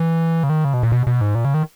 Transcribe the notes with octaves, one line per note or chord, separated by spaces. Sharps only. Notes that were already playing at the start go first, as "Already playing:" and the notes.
Already playing: E3
C#3
D#3
C#3
B2
A#2
B2
B2
G#2
A#2
C#3
D#3